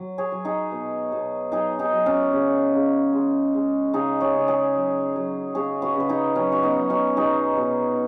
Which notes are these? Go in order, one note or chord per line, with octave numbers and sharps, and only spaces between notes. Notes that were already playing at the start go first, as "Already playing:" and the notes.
Already playing: F#3
G#4 C#5
F#3
D#4 G#4
B2
B2
F#3 D#4 G#4
D#4 G#4
F#3
C#4 F#4
C#3
C#3
G#3
G#3
C#3 D#4 G#4
G#4 C#5
C#3
G#4 C#5
F#3
F#3
C#3 G#4 C#5
F#4 B4
C#3 B4
D#4 G#4
F#3 C#4
F#4
B3 D#4
F#3
C#4 F#4
B2 D#4 G#4
B2